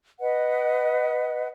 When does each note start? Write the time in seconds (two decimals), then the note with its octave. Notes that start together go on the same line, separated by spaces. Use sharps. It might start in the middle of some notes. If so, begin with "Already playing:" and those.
0.19 B4 D#5 F#5